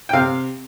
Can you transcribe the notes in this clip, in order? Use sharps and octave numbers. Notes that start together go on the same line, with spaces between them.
G5
C3 F5